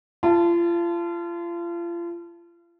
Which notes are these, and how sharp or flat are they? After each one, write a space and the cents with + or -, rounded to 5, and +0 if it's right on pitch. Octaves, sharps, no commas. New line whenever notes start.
F4 -35 A5 +0